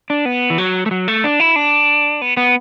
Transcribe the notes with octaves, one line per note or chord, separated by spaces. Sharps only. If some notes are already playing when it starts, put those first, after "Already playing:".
D4
B3
E3
F#3
A3
F#3
A3
D4
E4
D4
B3
B3